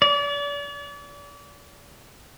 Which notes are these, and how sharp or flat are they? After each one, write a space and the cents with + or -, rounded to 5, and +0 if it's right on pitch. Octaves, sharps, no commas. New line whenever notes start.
D5 -40